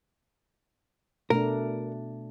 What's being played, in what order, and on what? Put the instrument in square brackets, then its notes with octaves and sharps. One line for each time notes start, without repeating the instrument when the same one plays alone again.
[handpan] B2 A3 D4 [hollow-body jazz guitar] A#4